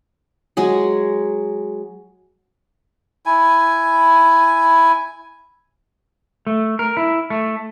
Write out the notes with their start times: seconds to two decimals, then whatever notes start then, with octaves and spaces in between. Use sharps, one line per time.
0.57 F#3 G#3 G#4
3.26 E4 G#5
6.47 A3
6.79 A#4
6.97 E4
7.30 A3